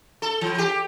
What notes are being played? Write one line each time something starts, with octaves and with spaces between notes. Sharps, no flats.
A4
E3
G4